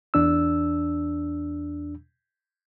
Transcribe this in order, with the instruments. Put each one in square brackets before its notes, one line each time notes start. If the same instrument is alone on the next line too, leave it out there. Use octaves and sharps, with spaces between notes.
[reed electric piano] E2 D4 E6